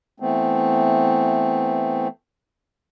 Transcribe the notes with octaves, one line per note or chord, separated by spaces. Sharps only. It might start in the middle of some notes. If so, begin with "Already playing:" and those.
E3 A3 B3 C4